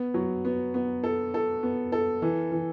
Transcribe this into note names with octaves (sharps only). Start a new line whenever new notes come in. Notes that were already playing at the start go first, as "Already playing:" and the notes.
Already playing: B3
F#3
B3
B3
A4
A4
B3
A4
E3
E3